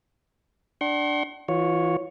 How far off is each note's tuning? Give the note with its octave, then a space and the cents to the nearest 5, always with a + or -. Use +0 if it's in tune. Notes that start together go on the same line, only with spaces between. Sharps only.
D4 +0 F#5 +45 C6 +40
E3 +0 F4 +40 C#5 +0